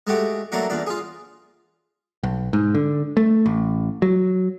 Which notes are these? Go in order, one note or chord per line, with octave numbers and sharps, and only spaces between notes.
G#3 A3 F#4 G4
F#3 A3 A#3 D4 F#4
E2 A#2 D4
F4 G#4
B1
G#2
D3
A3
A1
F#3